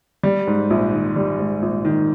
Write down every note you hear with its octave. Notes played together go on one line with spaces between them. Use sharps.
G3
G#2
A#1
D#3
G3
G#2
A#1
D#3